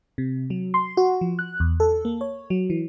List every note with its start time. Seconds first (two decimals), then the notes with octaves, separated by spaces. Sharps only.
0.18 C3
0.50 F#3
0.74 C6
0.97 F#4
1.21 F3
1.39 F#6
1.60 E2
1.80 A4
2.05 A#3
2.21 C#5
2.50 F#3
2.70 E3